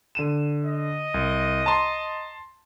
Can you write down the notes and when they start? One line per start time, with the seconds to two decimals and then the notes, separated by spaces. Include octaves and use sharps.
0.15 D3 D#7 E7
0.65 D#5
1.14 C2
1.66 A5 A#5 C6